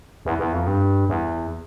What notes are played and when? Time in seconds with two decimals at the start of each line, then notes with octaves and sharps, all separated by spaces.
0.25 E2
0.39 E2
0.53 F2
0.67 G2
1.09 E2